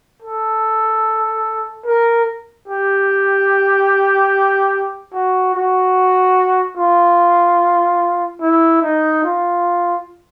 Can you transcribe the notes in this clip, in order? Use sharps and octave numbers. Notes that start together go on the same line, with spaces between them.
A4
A#4
G4
F#4
F#4
F4
E4
D#4
F4